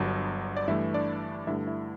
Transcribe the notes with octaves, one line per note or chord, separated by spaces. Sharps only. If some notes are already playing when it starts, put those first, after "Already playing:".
Already playing: G1 G2 F#3
D5
G2 E3 A3 E4 E5
D4 D5
G2 D3 A3 E4 E5
E4 E5